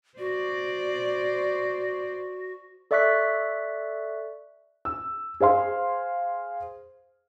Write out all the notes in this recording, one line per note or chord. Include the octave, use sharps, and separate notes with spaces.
F#4 C5 D5
A4 D5 E5 C#6 F#6 B6
E6
G#4 C5 F5 C6